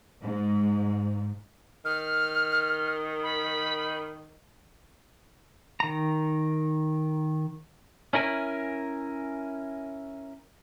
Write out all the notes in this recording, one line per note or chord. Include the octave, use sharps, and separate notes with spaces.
G#2
D#3 F6
B5
D#3 A#5
C#4 E4 A#4 G#5